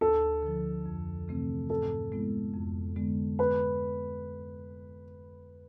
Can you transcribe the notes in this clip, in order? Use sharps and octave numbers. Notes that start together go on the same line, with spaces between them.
D2 A4
D3 F3
F2
C3 E3 A3 C4
G#2 A4
G#3 B3 E4
F2
D3 G#3 B3
D3 B4